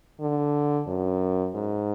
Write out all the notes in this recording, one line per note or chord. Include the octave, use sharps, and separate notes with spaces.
D3
F#2
G#2